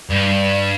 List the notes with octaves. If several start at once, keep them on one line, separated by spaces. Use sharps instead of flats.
G2